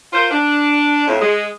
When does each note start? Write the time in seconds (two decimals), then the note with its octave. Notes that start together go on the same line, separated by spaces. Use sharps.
0.13 F4 A#4 C5
0.30 D4
1.07 F2 A2
1.20 G#3